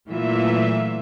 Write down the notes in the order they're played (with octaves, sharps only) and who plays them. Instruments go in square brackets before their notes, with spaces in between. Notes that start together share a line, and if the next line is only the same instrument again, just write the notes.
[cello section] A#2 E3 F#3 A3 F4 E5